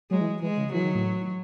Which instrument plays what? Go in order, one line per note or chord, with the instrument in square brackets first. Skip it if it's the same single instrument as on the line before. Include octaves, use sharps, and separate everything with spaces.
[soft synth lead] F#3 [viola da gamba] G#3
[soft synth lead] E3
[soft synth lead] E3 [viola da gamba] G#3
[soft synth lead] C#3
[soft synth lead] E3 [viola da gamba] F#3
[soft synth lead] D#3
A2